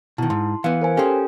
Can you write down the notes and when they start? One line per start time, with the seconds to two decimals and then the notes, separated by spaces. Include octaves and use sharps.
0.18 B2 D#3 E4 A5
0.30 G#2 C6
0.64 E3 B3 F5 C#7
0.82 A#4 C5 G#5
0.97 C#4 G4 A4 C5 G5